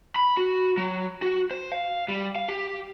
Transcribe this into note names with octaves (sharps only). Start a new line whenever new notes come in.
B5
F#4
F#3
F#4
C5
F5
G3
F5
G4